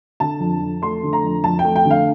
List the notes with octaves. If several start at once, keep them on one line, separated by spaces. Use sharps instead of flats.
D3 A5
F2
F2
A3 C6
D3
A#5
F2
F2 A5
G5
A3
G5
D3
F5